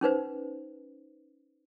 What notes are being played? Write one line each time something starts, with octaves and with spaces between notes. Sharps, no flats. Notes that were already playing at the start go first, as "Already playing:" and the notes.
C#4 D#4 B4 C5